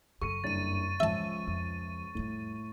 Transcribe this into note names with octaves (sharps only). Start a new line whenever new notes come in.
F#2 C#3 A4 C#6 C#7 D#7
F#1 G2 D4 A6 D#7
C#2 F3 E5 A5
F2
F2 A2 G3